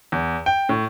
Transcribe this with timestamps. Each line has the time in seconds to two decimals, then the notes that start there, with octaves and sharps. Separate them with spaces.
0.12 E2
0.46 G5
0.69 A2